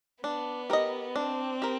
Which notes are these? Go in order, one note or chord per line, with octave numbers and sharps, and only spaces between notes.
B3 D4
G4 A#4 D#5
C4 D4
G4 A#4